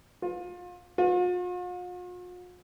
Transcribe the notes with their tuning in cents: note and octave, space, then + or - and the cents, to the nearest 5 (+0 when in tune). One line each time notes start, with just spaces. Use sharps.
F4 +30
F4 +45